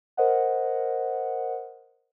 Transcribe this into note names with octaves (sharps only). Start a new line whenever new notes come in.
A#4 C5 D#5 F#5